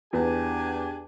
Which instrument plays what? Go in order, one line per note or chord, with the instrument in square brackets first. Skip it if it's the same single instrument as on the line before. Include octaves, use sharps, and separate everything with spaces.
[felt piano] E2 B3 [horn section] D4 G4 G#5